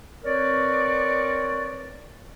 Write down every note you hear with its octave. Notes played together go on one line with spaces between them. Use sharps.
C4 A#4 B4 C#5 D5